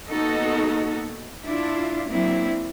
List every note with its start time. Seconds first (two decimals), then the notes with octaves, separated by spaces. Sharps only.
0.11 A#3 B3 D#4 F#4 A4
1.47 D4 E4 F4
2.10 F#3 A#3 C4 D4 E4